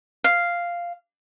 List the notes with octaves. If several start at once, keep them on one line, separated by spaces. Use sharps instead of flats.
F5